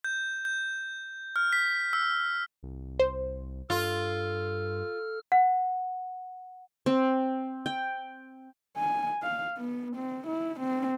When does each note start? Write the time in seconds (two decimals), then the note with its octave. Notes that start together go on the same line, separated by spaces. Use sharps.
0.04 G6
0.45 G6
1.36 F6
1.53 B6
1.93 E6
2.63 C2
2.99 C5
3.70 G2 F4 A4 F6
5.32 F#5
6.86 C4
7.66 G5
8.77 G#5
9.23 F5
9.57 B3
9.96 C4
10.27 E4
10.60 C4